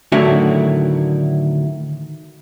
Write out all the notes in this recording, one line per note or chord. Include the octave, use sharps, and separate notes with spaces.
A2 D3 D#3 F#3 E4 F#4